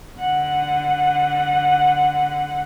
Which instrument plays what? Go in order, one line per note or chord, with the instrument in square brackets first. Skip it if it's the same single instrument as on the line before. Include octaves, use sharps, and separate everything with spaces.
[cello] D3 F#5